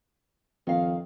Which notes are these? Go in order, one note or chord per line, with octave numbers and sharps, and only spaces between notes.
F2 D#3 F5